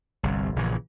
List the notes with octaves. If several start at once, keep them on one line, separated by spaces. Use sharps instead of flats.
G1 C2
A#1 A#2 C#3 E3